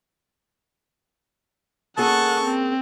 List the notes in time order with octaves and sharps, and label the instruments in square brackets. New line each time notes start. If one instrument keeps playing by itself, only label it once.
[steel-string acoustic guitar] A#3 C#4 G#4 [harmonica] A4 A5 [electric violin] F#5 C#6
[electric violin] C4